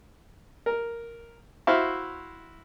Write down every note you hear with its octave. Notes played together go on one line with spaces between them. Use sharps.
A#4
E4 F#4 C5 E5 F5